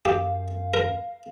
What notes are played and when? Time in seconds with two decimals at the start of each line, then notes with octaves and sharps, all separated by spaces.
0.05 F#2 G4 F5
0.74 A#4